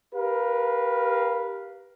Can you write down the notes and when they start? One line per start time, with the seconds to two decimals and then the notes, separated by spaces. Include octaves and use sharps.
0.14 G4 A#4 B4 F5